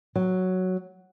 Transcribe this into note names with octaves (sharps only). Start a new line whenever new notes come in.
F#3